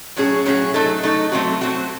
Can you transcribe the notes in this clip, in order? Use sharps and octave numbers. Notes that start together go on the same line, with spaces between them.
A2 F#3 C#4 G#4
A2 F#3 C#4 G#4
F#3 A3 D#4 A4
F#3 A3 D#4 A4
F#3 A3 C4 F#4
F#3 A3 C4 F#4